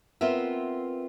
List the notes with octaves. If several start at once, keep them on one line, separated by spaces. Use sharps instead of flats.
B3 C4 F4 A#4 E5